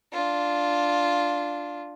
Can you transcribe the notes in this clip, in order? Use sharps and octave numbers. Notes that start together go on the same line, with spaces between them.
D4 F4